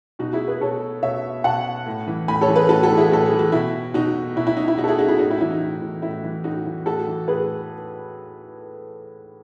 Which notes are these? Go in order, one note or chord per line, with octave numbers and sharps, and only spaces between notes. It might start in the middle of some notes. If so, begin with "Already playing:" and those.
B2 D#4 F#4
E4 G#4
G#4 B4
B2 A4 C#5
B2 C#5 E5
B2 F#5 A5
A2
E3
A2 G#5 B5
A4 C#5
E3
G#4 B4
A2 F#4 A4
F#4 A4
E3
E4 G#4
A2 A4
G#4
E3
F#4
B2 E4
B2 D#4 F#4
B2 E4
E4
D#4
E4
B2 D#4 F#4
A4
E4 G#4
D#4 F#4
E4 G#4
A2 D#4 F#4
E4
E3 E4
D#4
A2
E3
A2 E4
E3
A2 D#4 F#4
E3
A2 F#4 A4
E3
A2 G#4 B4